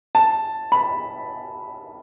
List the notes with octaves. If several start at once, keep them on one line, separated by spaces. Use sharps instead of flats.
A5
B5